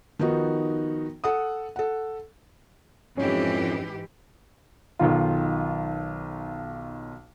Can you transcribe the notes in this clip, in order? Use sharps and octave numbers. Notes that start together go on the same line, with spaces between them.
D#3 F3 B3 D#4 F#4
A4 F#5 D#6
A4 F#5
F2 G#2 E3 C#4 G4 C#5
B1 D#3 F4